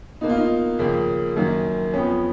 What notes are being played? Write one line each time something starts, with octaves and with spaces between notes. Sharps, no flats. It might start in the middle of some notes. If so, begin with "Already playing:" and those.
B2 A#3 D#4
F4
D#4
D#2 C#3 F3 A#3
F#2 D#3 F#3 A#3
F2 F3 B3 C#4